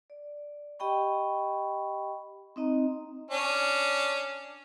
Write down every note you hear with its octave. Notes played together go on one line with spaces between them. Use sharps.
D5
G4 D#5 G5 B5 C#6
C4 D#4 D#5 A#5
C#4 D4